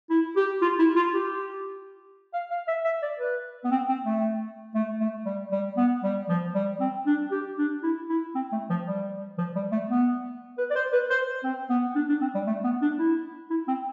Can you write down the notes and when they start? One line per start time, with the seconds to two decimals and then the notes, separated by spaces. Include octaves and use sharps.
0.10 E4
0.36 G4
0.62 F4
0.79 E4
0.96 F4
1.14 G4
2.34 F5
2.51 F5
2.68 E5
2.85 E5
3.02 D5
3.19 B4
3.64 B3
3.71 C4
3.89 C4
4.06 A3
4.75 A3
5.00 A3
5.26 G3
5.52 G3
5.77 B3
6.04 G3
6.29 F3
6.55 G3
6.80 C4
7.06 D4
7.31 G4
7.58 D4
7.83 E4
8.09 E4
8.35 C4
8.52 A3
8.70 F3
8.87 G3
9.38 F3
9.56 G3
9.72 A3
9.90 B3
10.58 B4
10.70 D5
10.75 C5
10.93 B4
11.10 C5
11.44 C4
11.70 B3
11.96 D4
12.09 D4
12.21 C4
12.35 G3
12.47 A3
12.64 B3
12.82 D4
12.99 E4
13.50 E4
13.68 C4